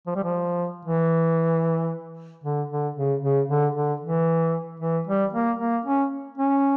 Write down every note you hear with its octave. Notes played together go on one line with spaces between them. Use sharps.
F3
G3
F3
E3
D3
D3
C#3
C#3
D3
D3
E3
E3
G3
A#3
A#3
C#4
C#4